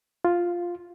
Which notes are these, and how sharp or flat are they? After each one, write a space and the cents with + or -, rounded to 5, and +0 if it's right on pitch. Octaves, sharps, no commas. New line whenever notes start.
F4 +0